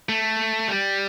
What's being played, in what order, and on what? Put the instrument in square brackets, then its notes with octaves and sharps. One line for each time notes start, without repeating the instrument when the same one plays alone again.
[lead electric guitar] A3
G3